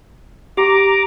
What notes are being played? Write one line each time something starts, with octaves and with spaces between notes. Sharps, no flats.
G4 A#5 D6